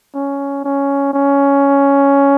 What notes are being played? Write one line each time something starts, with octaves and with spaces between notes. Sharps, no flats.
C#4
C#4
C#4